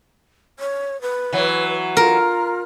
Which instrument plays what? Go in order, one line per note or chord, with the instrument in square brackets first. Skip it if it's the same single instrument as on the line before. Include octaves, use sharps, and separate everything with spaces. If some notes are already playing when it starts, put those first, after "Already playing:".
[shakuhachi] C#5
B4
[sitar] E3 F#3
[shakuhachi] F4 [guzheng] A#4